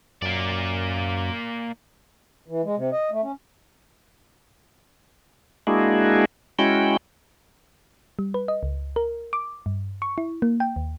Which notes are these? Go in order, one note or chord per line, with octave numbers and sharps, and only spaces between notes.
F#2 A#3 D5
E3
G#3
C3
D#5
A3
C#4
G#3 A#3 D4 E4 F#4 G#4
G#3 C#4 E4 F#4 G5
G3
B4
D#5
C#2
A#4
D6
G2
C#6
E4
A#3
G5
D#2